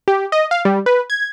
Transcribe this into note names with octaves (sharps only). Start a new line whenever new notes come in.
G4
D#5
F5
G3
B4
G#6